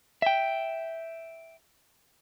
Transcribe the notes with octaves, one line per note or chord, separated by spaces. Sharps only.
E5 G5